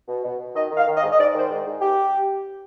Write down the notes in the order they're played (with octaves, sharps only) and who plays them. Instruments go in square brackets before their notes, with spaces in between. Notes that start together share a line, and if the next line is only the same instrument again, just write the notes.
[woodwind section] B2
B2
B2
D#3 D#5
D#3
F5
D#3
D#5
G#2
D#5
G#2 D5
D#3 C5
G#2
G#2
G4